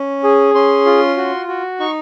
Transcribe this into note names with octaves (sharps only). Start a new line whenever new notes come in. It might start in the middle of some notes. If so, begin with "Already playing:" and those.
Already playing: C#4
G#4
C#4 C6
F4
F#4
F#4
D#4 C#6